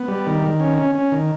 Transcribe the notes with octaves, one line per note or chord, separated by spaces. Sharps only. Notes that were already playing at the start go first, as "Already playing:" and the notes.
Already playing: B3
G3
D#3
D#3
C#4
C#4
C#4
D#3